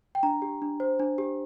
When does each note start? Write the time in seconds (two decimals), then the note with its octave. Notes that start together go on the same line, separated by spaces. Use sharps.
0.15 G5
0.23 D4 A#5
0.42 G4
0.62 D4
0.80 C5
1.00 D4
1.18 G4